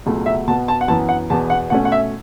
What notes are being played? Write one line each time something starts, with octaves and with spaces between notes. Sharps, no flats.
C#2 B2 F#3 A3
E5
B2 B3 A5
A5
F#5
F#2 E3 B3 A5
F#5
E2 B2 B3 A5
F#5
B2 A3 C#4 F#5
F#5
E5